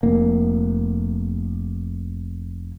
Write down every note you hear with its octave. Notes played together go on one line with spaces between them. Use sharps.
F1 A#3